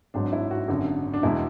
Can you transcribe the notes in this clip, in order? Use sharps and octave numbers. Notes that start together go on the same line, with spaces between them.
G#1 G#2 F#3 D4
E4
F#4
G#1 F#2 D3
D4
E2 B2 G#3 E4